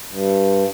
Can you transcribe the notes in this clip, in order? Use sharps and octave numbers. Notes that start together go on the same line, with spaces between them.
G2